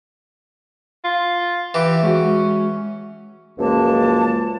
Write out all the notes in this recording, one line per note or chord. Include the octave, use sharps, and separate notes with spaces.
F4
E3 G4
G#3 C#4 F#4
C#2 F#2 F3 G#3 A#3 A5